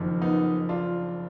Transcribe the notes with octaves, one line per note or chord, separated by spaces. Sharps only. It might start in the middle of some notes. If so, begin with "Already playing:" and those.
Already playing: F#1 F2 D#3
B3 D#4
D4 F4